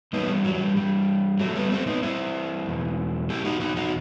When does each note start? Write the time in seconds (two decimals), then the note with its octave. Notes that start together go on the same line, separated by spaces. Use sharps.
0.13 G2 E3 B3 D#4
0.30 G3
0.45 F#3
0.61 G3
0.76 G3
1.39 F#3 A3
1.55 G3 B3
1.72 A3 C4
1.87 B3 D#4
2.03 C4 E4
2.66 E2 B2
3.30 E4 G4
3.45 D#4 F#4
3.60 D#4 F#4
3.76 D#4 F#4